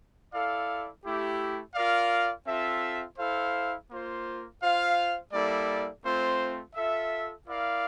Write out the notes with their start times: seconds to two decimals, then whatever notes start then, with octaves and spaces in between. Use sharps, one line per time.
0.32 E4 A4 D5 F5
1.04 A3 E4 G4
1.75 F4 A#4 D5 F5
2.46 C4 F4 A4 E5
3.18 E4 A4 C5 F5
3.89 A#3 F4 C5
4.61 F4 C5 F5
5.32 G3 A#3 E4 A4 D5
6.04 A3 C4 F4 C5
6.75 F4 A4 E5
7.47 E4 A#4 D5 F5